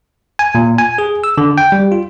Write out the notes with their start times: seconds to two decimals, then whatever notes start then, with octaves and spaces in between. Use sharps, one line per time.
0.39 G#5
0.55 A#2
0.78 G#5
0.98 G#4
1.24 E6
1.38 D3
1.58 G5
1.72 G3
1.92 F4